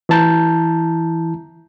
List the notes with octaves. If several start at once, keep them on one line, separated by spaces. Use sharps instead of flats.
E3 E4 A5 A#5 G6